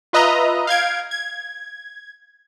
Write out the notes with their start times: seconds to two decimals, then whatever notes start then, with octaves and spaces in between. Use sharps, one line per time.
0.13 F4 B4 D#5 E5 A#5
0.67 F5 G6 G#6 D7
1.11 G#6